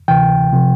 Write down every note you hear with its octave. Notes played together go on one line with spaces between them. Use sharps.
D2 C3 E3 G5
C3 F3